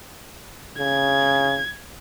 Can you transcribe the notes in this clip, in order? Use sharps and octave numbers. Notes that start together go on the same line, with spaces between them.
C#3 G#6